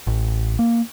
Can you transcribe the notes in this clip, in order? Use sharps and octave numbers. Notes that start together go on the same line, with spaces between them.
A1
A#3